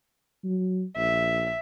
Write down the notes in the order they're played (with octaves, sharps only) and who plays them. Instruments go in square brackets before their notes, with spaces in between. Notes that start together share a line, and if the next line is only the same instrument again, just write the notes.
[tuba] F#3
[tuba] A#1 [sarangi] E5